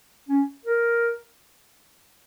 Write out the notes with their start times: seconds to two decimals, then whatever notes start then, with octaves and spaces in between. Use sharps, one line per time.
0.29 C#4
0.65 A#4